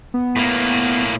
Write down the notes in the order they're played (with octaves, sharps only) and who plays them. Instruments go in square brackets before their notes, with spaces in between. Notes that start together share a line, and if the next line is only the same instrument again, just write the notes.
[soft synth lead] B3
[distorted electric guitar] A2 A#3